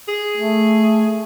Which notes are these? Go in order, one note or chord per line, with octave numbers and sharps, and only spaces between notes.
G#4
A3